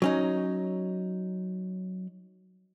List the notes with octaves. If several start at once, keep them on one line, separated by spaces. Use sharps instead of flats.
F#3 C#4 D#4